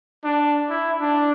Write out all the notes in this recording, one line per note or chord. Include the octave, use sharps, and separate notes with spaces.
D4
E4
D4